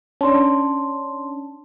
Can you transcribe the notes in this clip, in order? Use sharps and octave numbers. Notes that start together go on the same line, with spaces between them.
C#4 D4 A5 C6